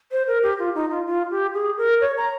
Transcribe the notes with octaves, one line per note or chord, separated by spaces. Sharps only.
C5
A#4
G4
F4
D#4
F4
F4
G4
G#4
A#4
C#5
A#5